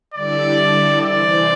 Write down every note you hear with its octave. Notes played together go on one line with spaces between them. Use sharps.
D3 G3 E4 A4 D5
C3 E3 C4 D5